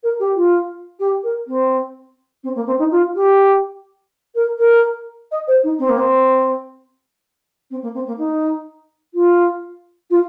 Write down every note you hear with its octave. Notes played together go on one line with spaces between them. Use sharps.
A#4
G4
F4
G4
A#4
C4
C4
A#3
C4
D#4
F4
G4
A#4
A#4
D#5
C5
D#4
C4
A#3
C4
C4
A#3
C4
A#3
D#4
F4
F4